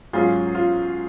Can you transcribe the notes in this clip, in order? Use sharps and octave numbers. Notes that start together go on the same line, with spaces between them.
G#2 F#3 C#4 F4 G#4
F4